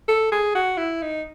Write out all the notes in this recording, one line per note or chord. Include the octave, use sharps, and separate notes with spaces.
A4
G#4
F#4
E4
D#4